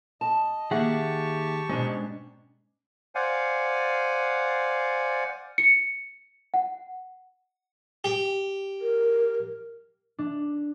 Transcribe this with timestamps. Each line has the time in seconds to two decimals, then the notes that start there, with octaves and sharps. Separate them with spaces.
0.21 D#5 A5
0.71 D#3 A#3 G4 G#4 E5 F#5 A5 C#6
1.69 G#2 B2 G#3 C#4 D4
3.15 C5 D5 F5 F#5 G#5
5.58 C#7
6.54 F#5
8.04 G4
8.81 A#4
10.19 D4